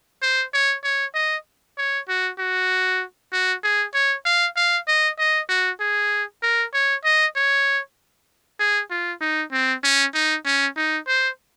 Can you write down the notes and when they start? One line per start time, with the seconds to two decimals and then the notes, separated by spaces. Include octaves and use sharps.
0.22 C5
0.54 C#5
0.84 C#5
1.15 D#5
1.78 C#5
2.09 F#4
2.39 F#4
3.33 F#4
3.64 G#4
3.94 C#5
4.26 F5
4.56 F5
4.88 D#5
5.19 D#5
5.49 F#4
5.80 G#4
6.43 A#4
6.74 C#5
7.05 D#5
7.36 C#5
8.60 G#4
8.91 F4
9.21 D#4
9.52 C4
9.84 C#4
10.14 D#4
10.45 C#4
10.77 D#4
11.08 C5